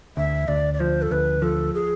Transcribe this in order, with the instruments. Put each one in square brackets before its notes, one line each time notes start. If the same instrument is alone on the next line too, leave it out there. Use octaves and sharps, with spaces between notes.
[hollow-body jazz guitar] D2 [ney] E5
[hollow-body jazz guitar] D2 [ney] D5
[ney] D5
[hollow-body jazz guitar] F3 [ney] C5
[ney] A4
[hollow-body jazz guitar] D2 [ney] B4
[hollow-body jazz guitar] F3 [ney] A4
[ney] G#4